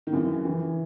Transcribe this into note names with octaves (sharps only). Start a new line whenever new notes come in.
D#3
F#2 C#3 E3
E3